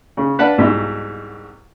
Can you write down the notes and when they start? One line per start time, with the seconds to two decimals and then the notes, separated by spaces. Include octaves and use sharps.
0.17 C#3
0.39 D4 B4 F5 F#5 A5 B5
0.58 C2 G#2 B2 E5 C6